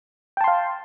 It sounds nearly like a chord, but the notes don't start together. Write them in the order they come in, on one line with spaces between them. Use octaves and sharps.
G5 A5 C6 F5